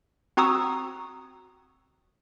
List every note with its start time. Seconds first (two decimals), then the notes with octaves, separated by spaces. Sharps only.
0.37 C4 F#4 A#5 C#6 D#6 E6